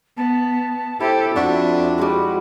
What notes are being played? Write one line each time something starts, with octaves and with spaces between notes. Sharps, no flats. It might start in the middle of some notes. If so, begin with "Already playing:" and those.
B3 A5
E4 G4 A4 C5
F2 D4 F#4 E5
G3 G#3 F#4